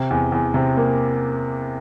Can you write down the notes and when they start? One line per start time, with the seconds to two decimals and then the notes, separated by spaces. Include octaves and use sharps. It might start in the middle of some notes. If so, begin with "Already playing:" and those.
Already playing: C3
0.10 E2
0.32 E2
0.54 C3
0.77 A#3